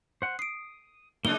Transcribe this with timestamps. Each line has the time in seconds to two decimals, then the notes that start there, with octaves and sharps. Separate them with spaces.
0.22 C5 F#5
0.39 D#6 C7 D7
1.25 C#3 F#3 G#3 A#3 D4 D#4 G7